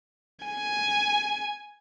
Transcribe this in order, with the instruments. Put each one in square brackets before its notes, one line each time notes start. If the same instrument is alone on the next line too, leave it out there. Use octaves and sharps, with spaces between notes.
[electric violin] G#5